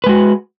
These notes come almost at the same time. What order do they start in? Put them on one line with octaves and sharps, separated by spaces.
B4 G#3 F#4